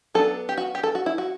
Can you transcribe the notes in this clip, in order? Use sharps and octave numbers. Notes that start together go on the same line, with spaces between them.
F#3 B3 D4 A4
G4
F#4
G4
A4
F#4
E4
F#4